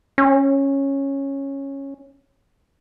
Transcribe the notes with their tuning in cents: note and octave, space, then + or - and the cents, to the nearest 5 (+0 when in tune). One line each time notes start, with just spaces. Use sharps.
C#4 -10